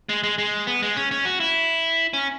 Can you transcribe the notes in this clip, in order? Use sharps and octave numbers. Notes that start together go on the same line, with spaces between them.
G#3
G#3
G#3
B3
G#3
C#4
C#4
F#4
E4
C#4